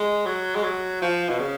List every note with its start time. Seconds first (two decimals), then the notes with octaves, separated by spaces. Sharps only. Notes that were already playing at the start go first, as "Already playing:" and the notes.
Already playing: G#3
0.26 F#3
0.55 G#3
0.64 F#3
1.02 F3
1.29 B2
1.39 C#3